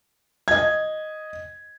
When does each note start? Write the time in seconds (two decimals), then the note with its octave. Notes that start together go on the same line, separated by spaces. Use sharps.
0.48 D#5 G#6